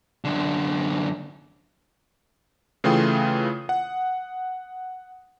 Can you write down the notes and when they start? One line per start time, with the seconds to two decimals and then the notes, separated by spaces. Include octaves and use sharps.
0.25 F#2 D3
2.84 C#3 E3 A3 F4 G5 D#6
3.69 F#5